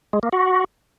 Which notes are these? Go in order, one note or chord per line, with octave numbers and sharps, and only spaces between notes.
G#3
A#3
F#4